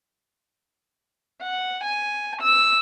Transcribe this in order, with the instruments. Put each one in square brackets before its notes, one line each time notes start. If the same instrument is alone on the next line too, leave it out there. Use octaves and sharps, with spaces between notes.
[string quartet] F#5
G#5
E6